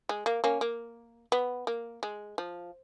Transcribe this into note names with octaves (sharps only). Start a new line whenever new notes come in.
G#3
A#3
A#3 C#4
A#3
B3
A#3
G#3
F3